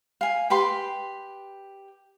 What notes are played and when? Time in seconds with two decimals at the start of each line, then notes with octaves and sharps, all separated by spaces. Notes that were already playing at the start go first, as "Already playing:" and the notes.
0.21 F5 G#5
0.50 G4 B4 G5 C6